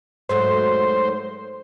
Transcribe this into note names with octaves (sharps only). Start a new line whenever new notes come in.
G#2 F#3 A3 C5